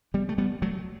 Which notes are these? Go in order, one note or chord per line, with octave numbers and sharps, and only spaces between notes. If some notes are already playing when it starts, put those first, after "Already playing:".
G3 B3
A3
G3 B3
F#3 A3